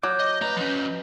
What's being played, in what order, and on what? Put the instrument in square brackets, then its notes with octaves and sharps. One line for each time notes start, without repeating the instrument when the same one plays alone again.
[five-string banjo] F#3 [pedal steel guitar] D6 [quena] G6
[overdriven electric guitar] D#5
[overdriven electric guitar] A3 A#5 [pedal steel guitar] B4 D#5
[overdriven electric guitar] F3 C#4